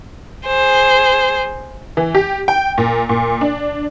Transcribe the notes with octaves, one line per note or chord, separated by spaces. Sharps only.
G#4 C5
E3
G4
G5
A#2
A#2
D4